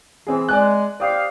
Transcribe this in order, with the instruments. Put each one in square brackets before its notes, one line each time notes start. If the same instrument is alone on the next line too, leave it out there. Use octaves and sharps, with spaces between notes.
[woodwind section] E3 [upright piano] C4 G#4
[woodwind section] G#3 [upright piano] D5 G#5 F#6
[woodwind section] G4 C5 F5 [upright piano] D5 D#6